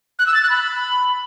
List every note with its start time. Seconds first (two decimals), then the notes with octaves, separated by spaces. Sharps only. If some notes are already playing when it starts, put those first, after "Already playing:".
0.19 F#6
0.27 E6
0.34 A6
0.42 F#6
0.50 B5